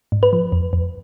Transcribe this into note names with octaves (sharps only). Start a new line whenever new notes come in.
G#2
B4
F3
F2
F2